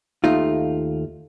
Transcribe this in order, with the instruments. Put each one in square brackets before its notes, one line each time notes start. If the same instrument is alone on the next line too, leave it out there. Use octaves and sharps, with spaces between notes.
[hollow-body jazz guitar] D#2 A3 D#4 F4